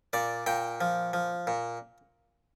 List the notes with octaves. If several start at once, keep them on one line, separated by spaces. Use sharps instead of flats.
A#2 D5
A#2 G5
F3
F3
A#2